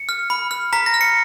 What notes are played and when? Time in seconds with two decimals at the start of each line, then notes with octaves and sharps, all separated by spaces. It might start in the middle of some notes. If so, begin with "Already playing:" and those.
Already playing: C#7
0.09 F6
0.30 B5
0.51 F6
0.73 A#5 B6
0.86 A#6
0.94 F6
1.01 C#7